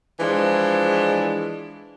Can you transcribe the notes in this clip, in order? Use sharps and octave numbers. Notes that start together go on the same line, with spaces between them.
E3 F3 G#3 D4